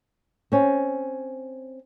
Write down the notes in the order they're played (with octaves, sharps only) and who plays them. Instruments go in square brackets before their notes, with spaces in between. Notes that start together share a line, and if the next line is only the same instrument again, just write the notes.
[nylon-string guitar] C4 C#4